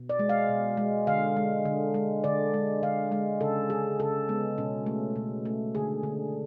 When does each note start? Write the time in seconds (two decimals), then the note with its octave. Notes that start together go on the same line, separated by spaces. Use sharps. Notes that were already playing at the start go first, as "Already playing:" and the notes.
Already playing: B2
0.09 D5
0.19 G#3
0.29 F5
0.49 B2
0.77 G#3
1.07 D3 F5
1.37 G#3
1.65 D3
1.94 G#3
2.24 D3 D5
2.54 G#3
2.83 D3 F5
3.12 G#3
3.41 C#3 A4
3.70 G#3 G#4
4.00 C#3 A4
4.29 G#3 B3
4.58 B2 C#4
4.86 A3
5.16 B2
5.46 A3
5.75 D3 G#4
6.03 D3